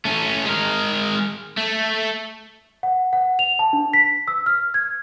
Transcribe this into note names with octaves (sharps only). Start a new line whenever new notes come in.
A3 C#4
G#3 A#4
A3
F#5
F#5
F7
A5
D4
B6
E6
F6
G#6